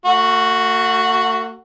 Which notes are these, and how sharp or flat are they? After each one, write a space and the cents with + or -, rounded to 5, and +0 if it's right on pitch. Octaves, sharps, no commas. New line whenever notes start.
A3 +45 F#4 +0